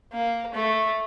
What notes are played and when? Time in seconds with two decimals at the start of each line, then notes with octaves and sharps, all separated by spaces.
0.13 A#3
0.55 A3